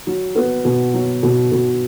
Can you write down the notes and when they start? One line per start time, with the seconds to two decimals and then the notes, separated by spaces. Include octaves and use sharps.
0.07 F#3
0.35 B3
0.64 B2
0.94 F#3
1.23 B2
1.51 B2